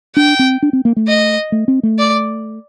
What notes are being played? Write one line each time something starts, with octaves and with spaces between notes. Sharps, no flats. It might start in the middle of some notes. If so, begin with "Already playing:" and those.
D4 G5
C4
D4
C4
A#3
A3
D#5
A3
C4
A3
D5